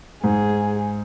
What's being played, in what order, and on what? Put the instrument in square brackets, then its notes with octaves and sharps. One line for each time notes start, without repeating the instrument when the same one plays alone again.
[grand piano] G#2 [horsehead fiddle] G#4